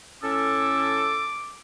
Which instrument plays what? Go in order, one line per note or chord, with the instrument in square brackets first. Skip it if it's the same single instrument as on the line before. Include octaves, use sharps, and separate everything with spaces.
[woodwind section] A2 C#4 A4 [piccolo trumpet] D6